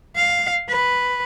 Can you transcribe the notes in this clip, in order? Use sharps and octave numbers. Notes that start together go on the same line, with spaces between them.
F5
B4